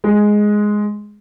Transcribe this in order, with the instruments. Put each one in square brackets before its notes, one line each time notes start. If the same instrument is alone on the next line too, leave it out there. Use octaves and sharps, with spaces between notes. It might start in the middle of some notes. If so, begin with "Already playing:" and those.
[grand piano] G#3